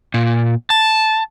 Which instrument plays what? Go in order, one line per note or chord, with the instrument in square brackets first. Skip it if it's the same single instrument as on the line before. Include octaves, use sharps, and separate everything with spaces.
[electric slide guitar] A#2
A5